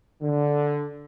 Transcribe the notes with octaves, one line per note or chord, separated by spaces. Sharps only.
D3